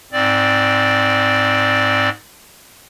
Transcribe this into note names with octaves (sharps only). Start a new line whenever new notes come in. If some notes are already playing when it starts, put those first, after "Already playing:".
G#2 C4 D5